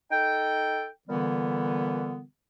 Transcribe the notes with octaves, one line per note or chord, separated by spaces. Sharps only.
D#4 A4 G5
A#2 D3 E3 G3 B3